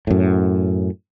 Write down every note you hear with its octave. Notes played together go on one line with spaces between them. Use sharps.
F#2 A2